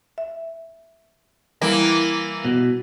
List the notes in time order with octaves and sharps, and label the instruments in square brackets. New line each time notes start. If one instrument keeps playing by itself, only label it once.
[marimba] E5
[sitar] E3 A#3 [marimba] G3 E4
[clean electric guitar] B2